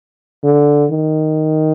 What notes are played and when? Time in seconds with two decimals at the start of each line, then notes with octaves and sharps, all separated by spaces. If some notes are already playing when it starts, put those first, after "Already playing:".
0.43 D3
0.91 D#3